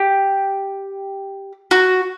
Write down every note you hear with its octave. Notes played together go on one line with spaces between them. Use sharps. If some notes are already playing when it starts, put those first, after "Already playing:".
Already playing: G4
F#4